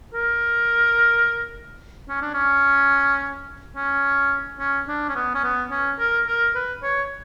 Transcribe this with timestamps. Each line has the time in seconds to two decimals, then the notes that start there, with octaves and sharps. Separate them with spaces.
0.14 A#4
2.09 C#4
2.21 D4
2.34 C#4
3.76 C#4
4.59 C#4
4.88 D4
5.09 C#4
5.15 B3
5.35 C#4
5.44 B3
5.71 C#4
5.99 A#4
6.27 A#4
6.55 B4
6.83 C#5